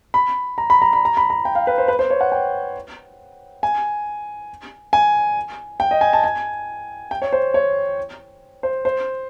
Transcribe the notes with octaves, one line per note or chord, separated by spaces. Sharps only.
B5
A#5
B5
A#5
B5
A#5
B5
A#5
G5
F5
B4
C5
B4
C5
C#5
F#5
G5
G#5
G#5
G5
D#5
G#5
A5
G#5
G5
C#5
C5
C#5
C5
C5